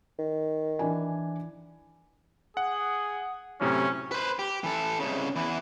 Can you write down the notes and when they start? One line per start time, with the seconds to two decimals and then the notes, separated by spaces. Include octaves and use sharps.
0.19 D#3
0.79 E3 D4 G#5
2.57 G#4 F#5
3.61 F#2 A2 C3 C#4
4.12 B4 C5
4.39 G4
4.64 E3 A4
4.99 C2 C#3
5.36 E2 E3